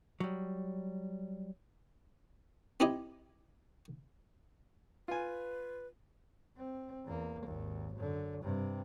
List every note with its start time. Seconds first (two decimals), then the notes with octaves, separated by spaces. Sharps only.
0.20 F#3 G3
2.80 C4 D#4 E4 G4 D#5 G#5
5.08 F4 B4 G#5
6.57 C4
7.05 E2 A#3
7.44 G#1 D#2
7.95 F#2 D3
8.41 G2 C3